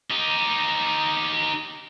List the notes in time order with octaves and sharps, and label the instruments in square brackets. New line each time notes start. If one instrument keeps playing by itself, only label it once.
[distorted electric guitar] D#4 G4